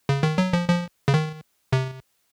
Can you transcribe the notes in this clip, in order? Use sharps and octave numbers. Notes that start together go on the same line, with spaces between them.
C#3
D#3
F#3
F3
F3
C#3
D#3
C3